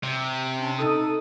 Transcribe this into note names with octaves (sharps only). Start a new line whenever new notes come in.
C3
C#4 D4
D#4 A4 D#6